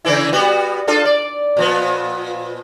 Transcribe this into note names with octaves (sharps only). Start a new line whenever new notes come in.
C#3 E3 E4
G3 B3 F#4
D4 F4 A4
D5
A#2 F3 B3